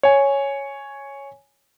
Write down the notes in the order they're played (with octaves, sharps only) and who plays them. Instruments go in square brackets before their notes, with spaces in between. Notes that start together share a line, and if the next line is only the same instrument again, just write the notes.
[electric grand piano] C#5 G#5